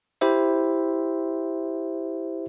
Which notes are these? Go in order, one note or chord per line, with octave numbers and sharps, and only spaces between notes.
E4 G4 C5 E5